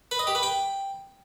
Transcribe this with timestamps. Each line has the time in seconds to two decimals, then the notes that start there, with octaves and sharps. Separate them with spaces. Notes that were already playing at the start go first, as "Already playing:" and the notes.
0.11 B4
0.19 D#5
0.27 G4
0.35 B4
0.43 G5